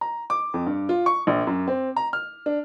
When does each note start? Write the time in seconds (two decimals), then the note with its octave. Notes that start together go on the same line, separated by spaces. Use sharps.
0.01 A#5
0.30 D6
0.54 F2
0.66 G2
0.89 F4
1.06 C#6
1.27 A#1
1.47 F#2
1.68 C4
1.96 A#5
2.13 F6
2.46 D4